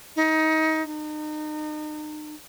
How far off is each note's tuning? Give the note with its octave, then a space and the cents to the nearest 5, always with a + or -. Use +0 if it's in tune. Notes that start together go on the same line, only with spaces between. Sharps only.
D#4 +25
D#4 -35